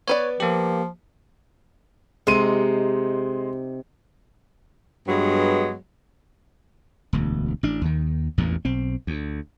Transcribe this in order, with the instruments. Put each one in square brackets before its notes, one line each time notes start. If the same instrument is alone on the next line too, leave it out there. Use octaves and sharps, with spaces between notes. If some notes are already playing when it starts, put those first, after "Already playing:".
[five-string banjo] B3 B4 D5 [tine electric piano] C#5
[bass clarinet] F3 [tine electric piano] A#3 G4
[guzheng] C3 C4 D#4 [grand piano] G#3 C6 D#7
[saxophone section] G2 F#3 G#3 B3
[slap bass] E1 D2
A1 D4
D#2 D#3
A1 E2 G2 A#2
B1 C4
D2